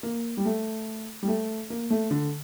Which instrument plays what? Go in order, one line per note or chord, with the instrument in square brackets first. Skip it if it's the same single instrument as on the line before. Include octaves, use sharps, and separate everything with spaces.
[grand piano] A#3
G3
A3
G3
A3
A#3
A3
D3